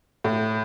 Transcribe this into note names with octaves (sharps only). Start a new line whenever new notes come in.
A2